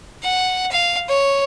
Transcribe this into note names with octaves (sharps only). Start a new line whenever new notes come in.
F#5
F5
C#5